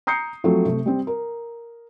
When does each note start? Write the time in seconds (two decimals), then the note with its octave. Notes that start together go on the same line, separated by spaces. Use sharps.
0.07 A#5 D#6 G6 C7 C#7
0.44 F3 F#3 A3 C4 A4
0.65 C3 A3
0.86 G3 C4
1.07 A#4